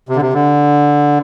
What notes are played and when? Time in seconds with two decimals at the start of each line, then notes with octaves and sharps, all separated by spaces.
0.09 C3
0.16 D3
0.22 C3
0.33 D3